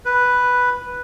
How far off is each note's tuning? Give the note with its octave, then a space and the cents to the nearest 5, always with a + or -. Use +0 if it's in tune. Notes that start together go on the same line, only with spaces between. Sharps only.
B4 +0